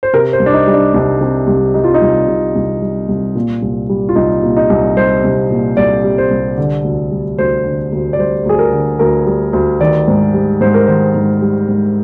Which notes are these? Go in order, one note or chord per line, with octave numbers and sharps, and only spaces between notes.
C5
C3 A#4
C5
C2
D4
D#4
G3
D4
C2 D4
C3
C2
G3 D#4
F4
D#4
C2
C3
C2
G3
C2
A#2
C2
G3
F4
C2 D#4
A#2
D#4
C2
G3 C5
C2
A#2
C2 D5
G3
C5
C2
D3
D2
G3
D2 C5
D3
D2
D5
G3 C5
D2 G#4
A#4
D3
D2 A#4
G3
D2
D#3 D5
G#2
G3
G#2 C5
A#4
D#3 C5
G#2
G3
G#2